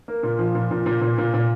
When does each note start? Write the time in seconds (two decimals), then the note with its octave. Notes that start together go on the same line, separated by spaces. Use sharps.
0.08 A#3
0.23 A#2
0.39 F3
0.55 A#2
0.71 A#2
0.86 A#2
1.01 A#2
1.18 A#2
1.34 A#2